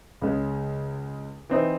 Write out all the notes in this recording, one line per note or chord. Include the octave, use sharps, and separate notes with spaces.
C#2 C#3 G#3
E3 C4 D#4